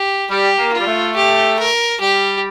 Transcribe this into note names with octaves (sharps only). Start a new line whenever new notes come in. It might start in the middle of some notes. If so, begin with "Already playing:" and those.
Already playing: G4
G3 G4
A#3
F4
G3
A3
G4
A#4
G3 G4